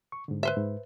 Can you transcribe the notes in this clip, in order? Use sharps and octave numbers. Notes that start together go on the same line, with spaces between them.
C#6
G#2 D3
B4 C5 E5
G#2